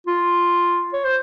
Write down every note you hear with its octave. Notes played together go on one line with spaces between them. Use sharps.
F4
C#5
C5